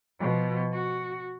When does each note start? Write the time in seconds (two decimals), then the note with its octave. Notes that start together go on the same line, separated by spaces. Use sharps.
0.20 B2 F3
0.74 F#4